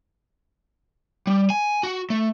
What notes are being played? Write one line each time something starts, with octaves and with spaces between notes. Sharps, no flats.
G3
G#5
F#4
A3